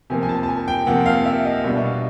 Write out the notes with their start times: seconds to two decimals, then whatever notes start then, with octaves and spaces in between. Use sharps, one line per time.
0.10 C3 F3 A#3 G#5
0.23 G#5
0.29 A5
0.43 A5
0.48 G#5
0.68 G5
0.87 C3 F3 A#3 F#5
1.06 F5
1.25 E5
1.45 D#5
1.64 B2 G3 B3 D4 E5
1.83 F5